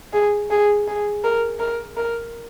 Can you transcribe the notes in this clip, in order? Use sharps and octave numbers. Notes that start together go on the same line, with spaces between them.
G#4
G#4
G#4
A#4
A#4
A#4